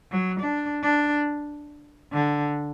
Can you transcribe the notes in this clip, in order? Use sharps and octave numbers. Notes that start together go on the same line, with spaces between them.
F#3
D4
D4
D3